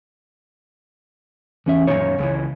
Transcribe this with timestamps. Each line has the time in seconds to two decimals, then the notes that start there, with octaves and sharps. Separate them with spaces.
1.66 E2 C#4 E5
1.87 F#2 A#2 D#3 C#5
2.18 C#2 C#3 E3